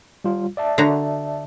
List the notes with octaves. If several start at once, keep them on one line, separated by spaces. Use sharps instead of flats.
G3 F4
D5 E5 A5
D3 F#4 A#5